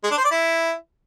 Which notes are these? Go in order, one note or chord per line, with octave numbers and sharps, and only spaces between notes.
G#3
D4
C5
D5
E4